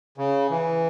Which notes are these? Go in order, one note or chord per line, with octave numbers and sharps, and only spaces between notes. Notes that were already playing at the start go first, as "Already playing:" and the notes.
C#3
E3